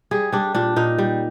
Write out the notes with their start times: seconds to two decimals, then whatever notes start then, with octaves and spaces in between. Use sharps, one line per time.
0.11 G3 G#4
0.32 G3 D4
0.55 A#2 D4
0.76 A#2 D#4
0.98 G3